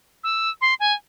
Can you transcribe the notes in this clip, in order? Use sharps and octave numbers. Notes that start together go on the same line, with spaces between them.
E6
C6
G#5